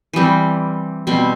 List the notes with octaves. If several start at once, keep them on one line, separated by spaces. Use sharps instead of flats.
E3 G3 C4
B2 G3 C4